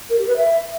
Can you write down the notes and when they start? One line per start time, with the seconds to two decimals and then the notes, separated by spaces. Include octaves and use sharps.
0.09 A#4
0.18 G4
0.27 B4
0.37 E5